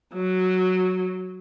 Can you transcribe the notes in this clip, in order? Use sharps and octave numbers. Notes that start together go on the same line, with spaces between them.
F#3